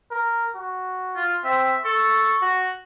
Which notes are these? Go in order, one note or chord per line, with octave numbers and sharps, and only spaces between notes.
A#4
F#4
F4
C4 E5
A4 C#6
F#4